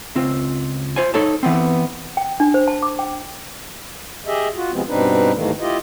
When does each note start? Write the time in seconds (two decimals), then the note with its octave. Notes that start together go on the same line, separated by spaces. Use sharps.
0.15 C#2 C4 F4
0.96 F4 C5 G#5
1.14 D#4 A4 C#5 A5
1.43 E3 B3 C4
2.17 G5
2.40 D4
2.54 C5
2.68 A5
2.83 D6
2.99 G5
4.27 G4 G#4 D#5 E5
4.55 F4 F#4
4.72 C3 F3 G#3 B3 C4
4.88 G2 B2 C4 D4 D#4 B4
5.34 D#2 G#2 D#3 E3 A3 A#3
5.60 E4 F4 G4 D#5